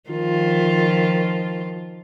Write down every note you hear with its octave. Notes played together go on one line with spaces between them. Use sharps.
D#3 F3 F4